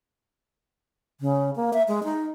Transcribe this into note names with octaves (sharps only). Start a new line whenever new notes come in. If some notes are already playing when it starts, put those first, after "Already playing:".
C#3
A#3
E5
G#3
D#4